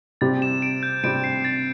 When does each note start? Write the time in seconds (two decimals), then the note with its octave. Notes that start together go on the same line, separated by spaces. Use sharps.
0.21 C3 G3 C4 G4 A6
0.42 E7
0.62 D7
0.83 G6
1.03 C3 G3 C4 G4 D7
1.24 C7
1.45 A6